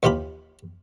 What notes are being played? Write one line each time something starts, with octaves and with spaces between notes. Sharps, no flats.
D#2 E3 F4 G4 B5